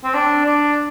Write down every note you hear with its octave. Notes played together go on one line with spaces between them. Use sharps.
C4
D4
D4